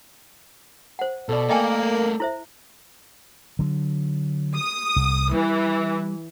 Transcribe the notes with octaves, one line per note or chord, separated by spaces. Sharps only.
C5 F#5
B2 A4 D5
A3 A#3 A#4 D#5 G5 G#5
E4 C5 E5
D3 F#3
D#6
C2
E3 G3